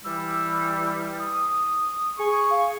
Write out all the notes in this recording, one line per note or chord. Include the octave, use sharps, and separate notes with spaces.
E3 G3 E6
D#6
G#4 C#6
F5